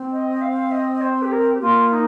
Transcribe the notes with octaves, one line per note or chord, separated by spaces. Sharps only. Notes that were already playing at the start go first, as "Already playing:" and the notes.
Already playing: C4
D#5
F5
D#5
D#5
C5
G4
A#4
G4
A#3 F4
D#4